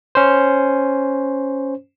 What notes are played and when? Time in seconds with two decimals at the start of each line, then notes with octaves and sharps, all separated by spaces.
0.15 C#4 C5